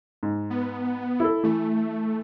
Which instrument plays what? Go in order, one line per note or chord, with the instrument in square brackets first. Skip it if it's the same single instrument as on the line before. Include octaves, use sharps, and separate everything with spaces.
[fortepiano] G#2
[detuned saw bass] B3
[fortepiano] E4 A4
[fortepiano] E3 [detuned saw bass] A3